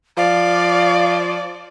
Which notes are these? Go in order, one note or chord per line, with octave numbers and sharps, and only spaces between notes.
F3 D5 F5